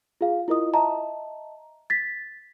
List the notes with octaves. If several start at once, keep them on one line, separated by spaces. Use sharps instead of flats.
F4 G#4 F5
E4 F4 A#4 D#5 D#6
D#5 E5 A5 A#5
A6 B6